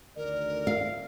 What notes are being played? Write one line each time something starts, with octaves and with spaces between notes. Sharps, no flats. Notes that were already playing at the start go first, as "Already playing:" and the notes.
D2 D#3 A#4 D5
F5